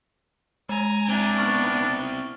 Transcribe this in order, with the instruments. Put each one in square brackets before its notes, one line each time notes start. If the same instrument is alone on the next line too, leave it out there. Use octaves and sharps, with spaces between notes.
[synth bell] G#3 [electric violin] G#5 A#5
[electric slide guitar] C4 E4 [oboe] D4
[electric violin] B3 D#4 [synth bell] C#6 F6 A6